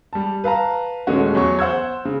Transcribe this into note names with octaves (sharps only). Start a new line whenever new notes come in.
G3 A5
B4 F5 A5 A#5
D#1 G#3 A3 C#4 F#4
E2 F#3 C#5 C#6
C5 F#5 E6 G#6
C#3